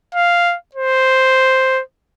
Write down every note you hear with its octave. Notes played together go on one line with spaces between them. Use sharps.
F5
C5